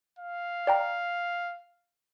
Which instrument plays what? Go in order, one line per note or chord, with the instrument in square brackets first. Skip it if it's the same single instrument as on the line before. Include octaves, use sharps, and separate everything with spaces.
[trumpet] F5
[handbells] D5 G5 A#5